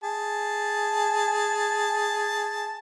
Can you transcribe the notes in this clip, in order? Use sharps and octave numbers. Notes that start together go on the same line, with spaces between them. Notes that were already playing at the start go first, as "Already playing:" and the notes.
G#4 A5